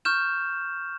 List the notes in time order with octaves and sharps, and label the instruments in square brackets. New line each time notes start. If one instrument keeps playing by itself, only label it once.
[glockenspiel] C#6 F6 G6 E7